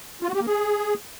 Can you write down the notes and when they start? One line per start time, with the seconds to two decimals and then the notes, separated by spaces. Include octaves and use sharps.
0.22 F4
0.28 F#4
0.35 G4
0.41 A#3
0.47 G#4